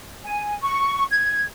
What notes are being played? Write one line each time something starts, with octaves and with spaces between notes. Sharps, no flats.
G#5
C#6
G#6